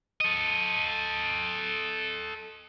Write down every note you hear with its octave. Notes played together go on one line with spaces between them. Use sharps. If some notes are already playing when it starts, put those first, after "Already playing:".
A4 D#5